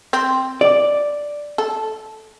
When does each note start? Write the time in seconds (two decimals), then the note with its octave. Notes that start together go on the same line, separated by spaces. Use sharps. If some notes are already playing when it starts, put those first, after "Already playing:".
0.13 C4
0.61 D5
1.58 A4